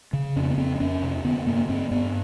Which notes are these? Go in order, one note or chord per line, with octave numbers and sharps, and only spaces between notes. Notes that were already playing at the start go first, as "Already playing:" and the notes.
C#3
F2 C#4
C4
B3
F2 C4
C4
F2 C#4
C3
D3 B3
G2 A#3
G2 C4
G2 B3